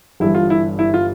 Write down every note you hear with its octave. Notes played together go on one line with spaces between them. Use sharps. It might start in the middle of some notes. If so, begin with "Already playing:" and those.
G1 G2 E3 G3 E4
F4
E4
E4
F4